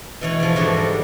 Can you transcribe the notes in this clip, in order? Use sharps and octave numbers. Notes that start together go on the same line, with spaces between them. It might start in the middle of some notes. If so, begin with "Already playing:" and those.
B2 E3 C#5
E2 F3
G#2 D3 E3 D4 F#4 C#5
G3